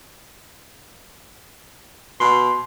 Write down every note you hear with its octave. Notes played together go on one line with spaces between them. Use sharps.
B2 C6